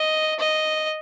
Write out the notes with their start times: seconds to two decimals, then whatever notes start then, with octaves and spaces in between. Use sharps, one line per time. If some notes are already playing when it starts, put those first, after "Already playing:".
Already playing: D#5
0.39 D#5